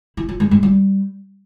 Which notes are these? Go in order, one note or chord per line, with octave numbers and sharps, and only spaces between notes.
E4
F4
G#3
G#3
G3